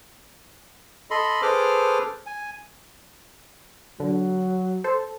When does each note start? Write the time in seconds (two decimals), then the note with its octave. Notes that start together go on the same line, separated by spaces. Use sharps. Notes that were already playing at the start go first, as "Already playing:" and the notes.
1.11 A4 D#5 B5 C6
1.42 G#4 A4 B4 C5 D6 F6
2.26 G#5
4.00 D3 F#3
4.84 A4 C5